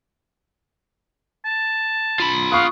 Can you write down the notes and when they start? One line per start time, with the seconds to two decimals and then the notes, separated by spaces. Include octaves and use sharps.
1.45 A5
2.20 F4 B5
2.52 F5 F#5 C#6 D#6